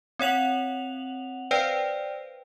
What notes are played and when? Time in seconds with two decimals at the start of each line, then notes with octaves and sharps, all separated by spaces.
0.19 C4 C#5 F#5 F7 F#7
1.51 B4 C5 D5 F5 G5